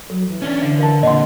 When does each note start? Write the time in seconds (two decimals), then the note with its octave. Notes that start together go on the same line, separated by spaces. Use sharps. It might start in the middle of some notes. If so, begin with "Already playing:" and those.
0.10 F#3 A4
0.29 E3
0.42 C#4 D4
0.62 D3 F5
0.78 A#4 F5 A5
1.03 A#2 D3 D#5 F#5 C6